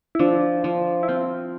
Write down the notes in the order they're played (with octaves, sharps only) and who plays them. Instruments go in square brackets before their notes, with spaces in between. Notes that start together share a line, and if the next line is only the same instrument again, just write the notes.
[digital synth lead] E4
[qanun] F3 [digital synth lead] D4
[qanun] F3
[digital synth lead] E4
[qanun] C4 [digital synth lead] F4